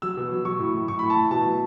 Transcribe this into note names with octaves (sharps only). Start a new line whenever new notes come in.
F#3 E6
B2
F#3
F#3 C#6
A2
A2
A2 C#6
A2 B5
A5
A2
B2 A5
F#3